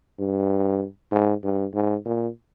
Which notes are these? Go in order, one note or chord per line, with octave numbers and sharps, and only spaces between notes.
G2
G#2
G2
G#2
A#2